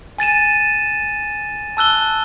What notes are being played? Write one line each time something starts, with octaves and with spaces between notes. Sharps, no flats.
G#5 A6 D#7 E7
A5 E6 F#6 G7